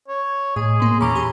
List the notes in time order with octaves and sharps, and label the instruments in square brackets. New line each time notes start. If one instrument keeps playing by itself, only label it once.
[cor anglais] C#5
[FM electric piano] A2 [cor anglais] G#4 [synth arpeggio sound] D#5
[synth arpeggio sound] A#2 A#3 [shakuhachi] C6
[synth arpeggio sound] E2 A#2 E3 [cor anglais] C#4 [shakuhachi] A#5 [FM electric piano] B5 D6
[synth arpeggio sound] E3 G4 [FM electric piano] B5